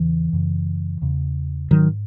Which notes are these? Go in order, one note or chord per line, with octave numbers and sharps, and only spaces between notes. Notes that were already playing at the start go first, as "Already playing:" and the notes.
Already playing: E2 C#3 E3
F#2 C#3
E2 C#3
G#2 D#3 F#3